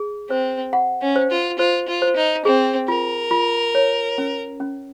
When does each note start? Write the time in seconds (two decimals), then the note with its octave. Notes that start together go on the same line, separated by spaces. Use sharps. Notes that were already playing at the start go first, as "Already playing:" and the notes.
Already playing: G#4
0.29 C4 C5
0.73 F#5
1.01 C#4
1.16 C5
1.31 F4
1.59 F4 C5
1.88 F4
2.02 C5
2.16 D#4
2.45 C4 G#4
2.88 F4 A#4
3.31 F4
3.75 C#5
4.18 C#4
4.60 C#4